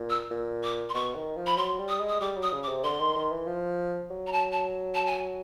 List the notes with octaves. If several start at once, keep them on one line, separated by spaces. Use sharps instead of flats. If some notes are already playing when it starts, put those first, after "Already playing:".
Already playing: A#2
E6
A#2
D6
C6
B2 C#6
D#3
F3
B5
F#3 C6
G3
D#6
G#3
D#6
G3 D6
F#3
D#6
C#3
D6
C3
D3 C6
D#3
D#3
E3
F3
F#3
A#5
A5
A5
A5
G#5